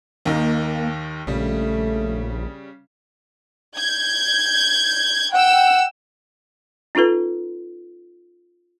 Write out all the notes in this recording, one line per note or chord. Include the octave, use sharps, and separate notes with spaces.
D#2 D#3 A#3 D#4
A#1 C#3 G3 A3
G6 G#6
F#5 G5 E6
C#4 D#4 F4 A4 B4